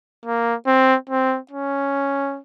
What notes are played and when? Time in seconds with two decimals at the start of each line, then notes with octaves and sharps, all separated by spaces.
0.26 A#3
0.67 C4
1.09 C4
1.51 C#4